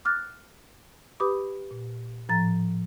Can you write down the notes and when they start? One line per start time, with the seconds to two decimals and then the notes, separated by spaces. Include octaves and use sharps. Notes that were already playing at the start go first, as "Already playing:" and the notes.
0.05 D6 F6 F#6 A6
1.20 G4 B4 B5 D6 D#6
1.71 A#2
2.29 A2 F3 A#5 A6